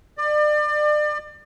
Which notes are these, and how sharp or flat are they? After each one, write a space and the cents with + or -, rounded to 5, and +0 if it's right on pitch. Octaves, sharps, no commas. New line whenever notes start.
D5 +35